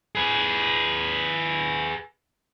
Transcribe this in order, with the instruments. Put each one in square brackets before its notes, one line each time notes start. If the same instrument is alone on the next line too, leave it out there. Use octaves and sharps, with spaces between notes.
[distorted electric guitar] G#4 B4